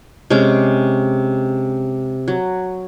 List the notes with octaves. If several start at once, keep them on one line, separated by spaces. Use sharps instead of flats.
C3 G#3 C#4 D6
F#3